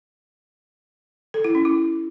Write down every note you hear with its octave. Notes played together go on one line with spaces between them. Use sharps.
A4
E4
C#4
E4